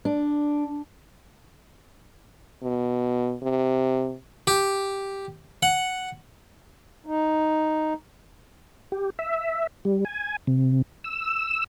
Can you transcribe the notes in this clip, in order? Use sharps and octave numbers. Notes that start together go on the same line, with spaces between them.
D4
B2
C3
G4
F#5
D#4
G4
E5
G3
G#5
C3
E6